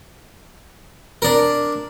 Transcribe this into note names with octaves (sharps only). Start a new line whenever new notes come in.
D4 A#4